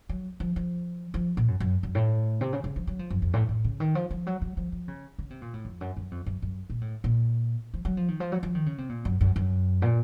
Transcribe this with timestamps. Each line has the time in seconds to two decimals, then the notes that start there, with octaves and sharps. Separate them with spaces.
0.09 F#3
0.40 F3
0.56 F3
1.14 F3
1.37 A#2
1.48 F#2
1.60 F#2
1.83 F#2
1.95 A2
2.41 C3
2.53 C#3
2.64 C#3
2.76 F3
2.87 F#3
2.99 F3
3.10 F#2
3.22 F2
3.33 A2
3.49 A2
3.64 C#3
3.80 D#3
3.95 F3
4.11 F3
4.27 F#3
4.42 F#3
4.57 F3
4.72 F3
4.88 C#3
5.18 C#3
5.30 C3
5.42 A#2
5.54 A2
5.65 F2
5.81 F#2
5.97 F#2
6.11 F2
6.26 F#2
6.42 F#2
6.70 A#2
6.81 A2
7.04 A#2
7.74 F3
7.85 F#3
7.97 F3
8.08 D#3
8.20 F3
8.32 F#3
8.43 F3
8.55 D#3
8.66 C#3
8.78 C3
8.89 A#2
9.05 F#2
9.21 F#2
9.36 F#2
9.82 A#2